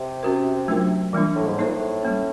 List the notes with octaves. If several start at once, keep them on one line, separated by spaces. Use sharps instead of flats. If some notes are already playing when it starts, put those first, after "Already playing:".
Already playing: C3
C#4 F#4 A#4
F#3 A3 D4 F4 A#4
A#2 E3 G3 A#3 D4
A2
G#2
A2 A#3 D#4 G#4 C5
A#2
A2
G3 A#3 C#4